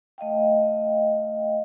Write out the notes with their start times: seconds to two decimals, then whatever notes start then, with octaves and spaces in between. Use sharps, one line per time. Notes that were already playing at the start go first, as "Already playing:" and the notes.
0.18 A3 D#5 F5 G5